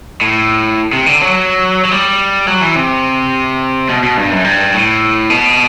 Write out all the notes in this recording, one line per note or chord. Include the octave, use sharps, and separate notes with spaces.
A2
C3
D3
F#3
F#3
G3
F#3
E3
C3
B2
B2
G2
F#2
G2
A2
B2